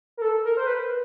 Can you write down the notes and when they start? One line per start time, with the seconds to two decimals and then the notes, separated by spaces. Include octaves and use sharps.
0.17 A#4
0.22 A4
0.45 A#4
0.57 C5
0.67 B4